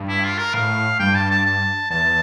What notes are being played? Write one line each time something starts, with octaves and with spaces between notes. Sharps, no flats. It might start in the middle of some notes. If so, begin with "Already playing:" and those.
Already playing: G2
E4
F4
A#4
A2 F5
G2 G5
A5
A5
A5
E2 A5